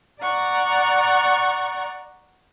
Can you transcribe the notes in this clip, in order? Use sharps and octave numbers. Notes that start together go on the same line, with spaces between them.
D5 F#5 A#5 C#6